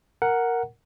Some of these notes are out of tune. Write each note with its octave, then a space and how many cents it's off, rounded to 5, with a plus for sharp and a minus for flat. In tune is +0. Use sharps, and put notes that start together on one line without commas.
A#4 +0 F#5 +0